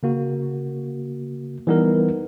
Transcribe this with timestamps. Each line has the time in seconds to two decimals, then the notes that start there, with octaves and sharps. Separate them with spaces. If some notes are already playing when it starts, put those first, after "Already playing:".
0.03 C#3 A#3 F#4
1.67 E3 G3 B3 D#4 A#4